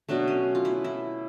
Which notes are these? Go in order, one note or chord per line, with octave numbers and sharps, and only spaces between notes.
B2 F#3 A3 D4
C#4
F4
E4
E4